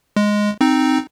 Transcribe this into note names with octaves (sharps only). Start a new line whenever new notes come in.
G#3
C4 D#4